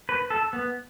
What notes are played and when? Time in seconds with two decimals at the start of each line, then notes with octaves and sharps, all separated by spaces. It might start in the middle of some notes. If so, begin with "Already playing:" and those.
0.09 B4
0.30 A4
0.53 B3